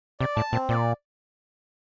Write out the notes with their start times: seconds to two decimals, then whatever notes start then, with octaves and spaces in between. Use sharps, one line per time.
0.20 C3 D5
0.36 A2 A5
0.52 A#2 C4
0.69 A#2 D5